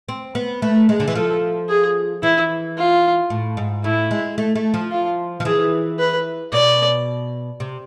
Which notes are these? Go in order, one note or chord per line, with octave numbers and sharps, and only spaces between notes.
C4
B3
A3 B4
G#3
D3
E3
F3 A4
G#4
E3 E4
F4
A2
G#2
A2 E4
G#3
A3
A3
F3
F4
F3
E3 G#4
B4
B2 D5
C3